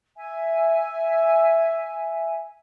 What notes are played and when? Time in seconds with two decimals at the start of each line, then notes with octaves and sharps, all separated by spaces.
0.16 E5 G#5